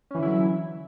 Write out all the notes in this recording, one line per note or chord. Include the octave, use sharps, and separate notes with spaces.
D3 E3 F#3 C#4 E4